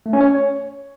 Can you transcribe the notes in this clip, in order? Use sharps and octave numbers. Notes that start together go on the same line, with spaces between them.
A3
C#4
C#5